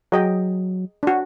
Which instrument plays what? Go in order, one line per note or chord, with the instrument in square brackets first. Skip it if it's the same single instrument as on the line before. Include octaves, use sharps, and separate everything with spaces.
[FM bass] F#3 [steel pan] G#4 D#5 G5
[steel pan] D4 F#4